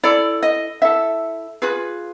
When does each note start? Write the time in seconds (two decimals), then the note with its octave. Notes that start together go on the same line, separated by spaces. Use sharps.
0.03 E4 A4 D5
0.43 D#5
0.82 E4 A4 E5
1.62 F4 G#4 B4